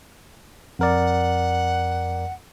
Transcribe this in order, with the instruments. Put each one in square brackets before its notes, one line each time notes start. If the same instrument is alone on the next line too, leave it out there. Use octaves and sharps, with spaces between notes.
[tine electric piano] F2 A#4 D5 [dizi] F#5